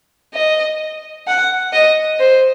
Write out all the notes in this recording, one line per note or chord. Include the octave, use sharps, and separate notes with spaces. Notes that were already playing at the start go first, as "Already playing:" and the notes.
D#5
F#5
D#5
C5